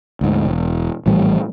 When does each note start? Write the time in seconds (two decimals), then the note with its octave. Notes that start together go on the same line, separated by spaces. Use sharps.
0.21 D2 G#2
0.46 E1
1.06 A#1 A2 E3 G3